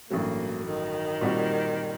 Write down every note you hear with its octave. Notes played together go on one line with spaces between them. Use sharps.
A1 G2 F#3 A3 A#3
D#3
A#2 G3 C4 F#4